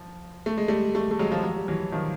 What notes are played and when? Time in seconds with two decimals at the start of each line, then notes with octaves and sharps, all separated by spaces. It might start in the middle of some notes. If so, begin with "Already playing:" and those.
Already playing: F3
0.46 A3
0.57 G#3
0.68 G3 A3
0.95 G3 A3
1.11 A3
1.19 F#3 G#3
1.31 F3 G3
1.43 F#3
1.56 G3
1.68 E3 F#3
1.92 D#3 F3